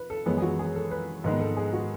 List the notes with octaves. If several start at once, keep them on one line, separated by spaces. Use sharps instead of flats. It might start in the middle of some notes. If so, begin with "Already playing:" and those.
Already playing: B4
A4
F#2 E3 G#3 B3 G#4
G#4
F#4
G#4
A4
B4
G#2 D#3 G#3 B3 B4
A4
G#4
F#4